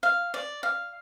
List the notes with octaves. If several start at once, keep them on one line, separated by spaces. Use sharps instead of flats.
F5
D5
F5